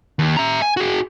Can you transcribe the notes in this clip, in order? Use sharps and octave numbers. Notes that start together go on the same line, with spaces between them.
D#2
E5 A#5
G#5
F#4 G#4